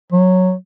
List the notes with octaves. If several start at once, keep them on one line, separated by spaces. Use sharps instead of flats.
F#3